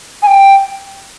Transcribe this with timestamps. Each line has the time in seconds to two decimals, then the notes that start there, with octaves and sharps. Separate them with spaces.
0.22 G#5
0.27 G5